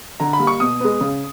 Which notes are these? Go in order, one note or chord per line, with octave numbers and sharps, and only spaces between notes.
D3 A#5
B5
G3 A#3
C#6
B2 D#6
G#3 B3
C#3